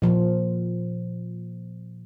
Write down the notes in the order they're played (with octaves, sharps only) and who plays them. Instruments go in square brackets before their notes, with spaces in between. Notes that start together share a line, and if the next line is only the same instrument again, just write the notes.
[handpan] A#2 F3